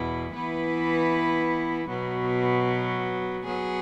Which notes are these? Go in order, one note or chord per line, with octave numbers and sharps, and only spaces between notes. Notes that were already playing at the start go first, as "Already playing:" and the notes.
Already playing: E2 B2 B3 E4
E3 B3 E4 B4
B2 F#3 B3
F#3 B3 G#4